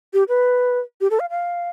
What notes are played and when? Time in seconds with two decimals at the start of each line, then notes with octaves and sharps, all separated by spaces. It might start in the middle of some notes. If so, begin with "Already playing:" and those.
0.13 G4
0.29 B4
1.01 G4
1.11 A4
1.20 F5
1.30 F5